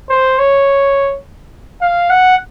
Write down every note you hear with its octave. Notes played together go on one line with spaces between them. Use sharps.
C5
C#5
F5
F#5